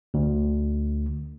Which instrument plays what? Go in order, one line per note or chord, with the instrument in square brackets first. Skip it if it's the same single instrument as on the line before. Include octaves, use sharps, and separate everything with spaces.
[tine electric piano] D2